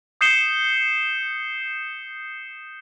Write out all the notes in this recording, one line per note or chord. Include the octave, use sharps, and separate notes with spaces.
D#6 G6 C7 C#7 E7 G7